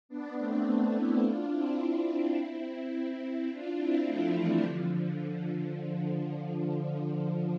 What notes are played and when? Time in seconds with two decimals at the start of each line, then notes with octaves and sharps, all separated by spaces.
0.09 B3 D4
0.37 A3 C4
0.65 B3 D4
0.93 C4 E4
1.22 D4 F4
1.50 C4 E4
1.79 D4 F4
2.07 C4 E4
3.49 D4 F4
3.77 C4 E4
4.05 F3 A3
4.34 E3 G3
4.62 D3 F3